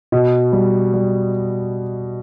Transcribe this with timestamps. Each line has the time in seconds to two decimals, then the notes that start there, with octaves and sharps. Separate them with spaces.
0.12 B2 D#5
0.53 G3
0.94 G3